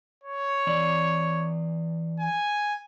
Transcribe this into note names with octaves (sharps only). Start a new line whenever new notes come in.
C#5
E3 D5
G#5